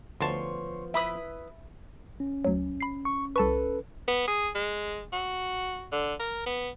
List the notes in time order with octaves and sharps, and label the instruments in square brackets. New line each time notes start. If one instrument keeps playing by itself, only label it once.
[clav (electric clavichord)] D2 A5 [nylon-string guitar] F3 B3 [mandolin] C#5 C6
[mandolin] E4 B4 D#6 [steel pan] E5 B5
[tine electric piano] C#4
[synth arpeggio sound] D2 F#3
B5 C7
[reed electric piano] C#6
[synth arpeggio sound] C2 A5 C#6 [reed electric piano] A4 B4
[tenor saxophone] B3
G#4
G#3
F#4
D3
A#4
B3